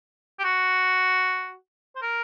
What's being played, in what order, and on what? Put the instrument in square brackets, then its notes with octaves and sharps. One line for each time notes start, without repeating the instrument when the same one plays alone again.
[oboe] G4
F#4
C5
A#4